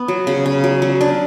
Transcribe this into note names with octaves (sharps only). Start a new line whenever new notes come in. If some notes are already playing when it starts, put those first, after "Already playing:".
Already playing: B3
F#3
C#3
C#3
F#3
F#3
D4